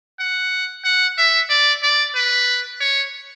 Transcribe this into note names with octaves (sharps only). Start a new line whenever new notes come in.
F#5
F#5
E5
D5
D5
B4
C#5